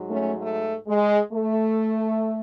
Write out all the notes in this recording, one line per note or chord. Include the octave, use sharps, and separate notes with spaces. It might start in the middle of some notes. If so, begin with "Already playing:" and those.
Already playing: G#2 F#3
A3 C#4
A3
G#3
A3